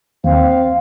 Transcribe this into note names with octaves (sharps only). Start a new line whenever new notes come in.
D#2 C4 F5